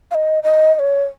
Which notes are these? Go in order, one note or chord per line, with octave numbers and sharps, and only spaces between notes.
F5
D#5
D#5
D#5
C#5